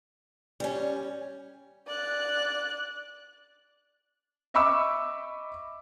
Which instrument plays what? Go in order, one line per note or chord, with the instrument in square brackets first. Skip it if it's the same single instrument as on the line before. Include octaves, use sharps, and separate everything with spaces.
[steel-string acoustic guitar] G3 C#4
[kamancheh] D5 F#6
[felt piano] D#5 E5 B5 C#6 D6 E6